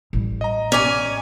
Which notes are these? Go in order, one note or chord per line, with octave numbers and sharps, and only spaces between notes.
A1 G3
D#5 A#5
C#4 D5 G#5 D6